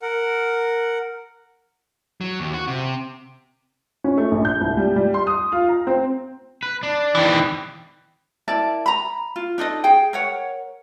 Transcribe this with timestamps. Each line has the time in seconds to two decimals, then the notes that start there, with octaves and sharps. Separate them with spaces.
0.02 A#4 F#5
2.21 F#3
2.40 D#2
2.54 F#4
2.68 C3
4.04 C#4
4.18 A3
4.31 A#1
4.45 G6
4.61 C2
4.77 G3
4.96 G3
5.14 C6
5.27 D#6
5.52 F4
5.68 A#5
5.87 C4
6.63 B4
6.83 D4
7.15 D#3 E3
8.48 E4 A#4 D5 A5
8.86 A#5 B5
9.36 F4
9.58 D4 D#4 A4 D#5
9.84 G#4 G5
10.13 A#4 C#5 F#5